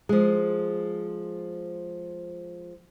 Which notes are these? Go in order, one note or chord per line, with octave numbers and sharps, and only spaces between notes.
F3 G#3